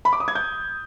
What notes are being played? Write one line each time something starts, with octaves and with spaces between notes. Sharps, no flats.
B5
D6
D#6
G#6
G6